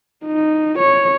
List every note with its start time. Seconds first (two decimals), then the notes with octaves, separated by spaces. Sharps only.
0.25 D#4
0.79 C#5